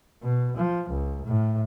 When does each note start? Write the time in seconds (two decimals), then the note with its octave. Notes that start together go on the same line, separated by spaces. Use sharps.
0.22 B2
0.57 F3
0.89 C#2
1.25 A2